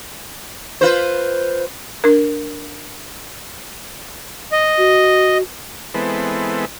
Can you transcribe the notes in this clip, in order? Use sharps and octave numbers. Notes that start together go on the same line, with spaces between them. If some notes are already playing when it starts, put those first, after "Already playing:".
F4 B4 C5
D4 A#4
D#5
F#4
E3 G#3 B3 C4 A4